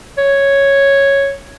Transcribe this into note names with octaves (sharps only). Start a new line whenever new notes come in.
C#5